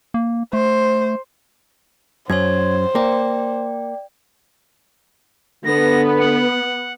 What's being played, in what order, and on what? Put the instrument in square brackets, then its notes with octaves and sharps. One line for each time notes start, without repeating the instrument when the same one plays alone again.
[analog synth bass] A#3
[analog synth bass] A3 [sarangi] C5
[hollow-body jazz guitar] F#2 [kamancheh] C5 [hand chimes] C#5 C6 G#6
[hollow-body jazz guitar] A#3 [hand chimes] D5 G5
[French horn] D3 [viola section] B3 [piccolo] A#6
[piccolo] F#5